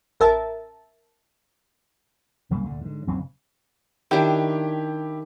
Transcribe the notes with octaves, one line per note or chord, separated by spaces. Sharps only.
A1 A#4 E5 A5 A6
B1 C#3 G3 A#3
D2 A#2 D3
G#2 D3
F#1 B1 C#3 C4
D#3 D4 E4 G4 G5